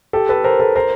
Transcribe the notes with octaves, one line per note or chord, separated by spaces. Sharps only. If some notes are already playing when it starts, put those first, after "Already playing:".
G4 A4
A4 B4
A#4 C5
A4 B4
A#4 C5